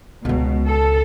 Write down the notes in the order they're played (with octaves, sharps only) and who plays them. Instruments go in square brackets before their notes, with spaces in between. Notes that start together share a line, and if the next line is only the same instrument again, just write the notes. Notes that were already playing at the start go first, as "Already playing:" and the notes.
[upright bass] C#2 G#3 [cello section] B2
[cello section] A4